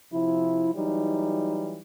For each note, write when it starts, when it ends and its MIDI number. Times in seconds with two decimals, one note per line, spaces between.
0.13 0.70 48
0.13 0.70 53
0.13 0.70 64
0.75 1.80 52
0.75 1.80 54
0.75 1.80 55
0.75 1.80 63